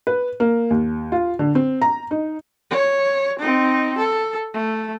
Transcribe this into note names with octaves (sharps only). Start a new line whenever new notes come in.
B4
A#3
D#2
F4
D3
C4
A#5
D#4
C#5
C4 D#4
A4
A3